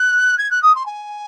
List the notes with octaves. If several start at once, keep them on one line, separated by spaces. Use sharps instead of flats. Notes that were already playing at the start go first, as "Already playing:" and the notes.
Already playing: F#6
G#6
F#6
D#6
C6
G#5